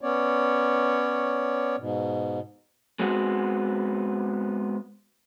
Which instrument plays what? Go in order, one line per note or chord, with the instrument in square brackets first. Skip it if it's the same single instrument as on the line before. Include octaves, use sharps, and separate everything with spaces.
[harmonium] B3 C#4 C#5 D5
G#2 B2
[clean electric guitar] G#3 B3 C4 F#4